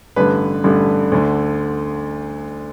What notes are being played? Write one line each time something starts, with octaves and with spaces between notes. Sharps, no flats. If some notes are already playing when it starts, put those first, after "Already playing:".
A1 G2 D3 B4
A1 G2 D3
D2 D3